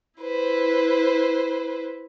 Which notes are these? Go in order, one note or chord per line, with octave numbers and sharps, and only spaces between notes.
E4 B4 C5